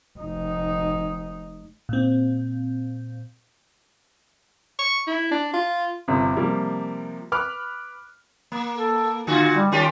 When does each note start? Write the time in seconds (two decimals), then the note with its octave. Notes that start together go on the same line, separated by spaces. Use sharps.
0.19 F1 D#4
1.89 A#2 C4
4.79 C#6
5.07 E4
5.31 D4
5.54 F4
6.08 G1 C3
6.37 C3 F3 G3 A#3
7.32 B4 B5 D6 F6 F#6
8.52 A#3
8.76 A4
9.27 A#2 D3 F4 F#4
9.55 G3
9.72 D#3 C#4 F4 G4